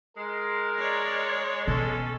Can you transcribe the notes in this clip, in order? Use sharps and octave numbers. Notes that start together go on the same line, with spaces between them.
G#3 A#4
C#5 D5
B2 C#4 A4